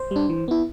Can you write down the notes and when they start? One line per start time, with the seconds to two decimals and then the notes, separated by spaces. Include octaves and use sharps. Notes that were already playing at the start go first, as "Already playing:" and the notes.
Already playing: C5
0.11 G3 D4
0.29 E3
0.48 B3 E4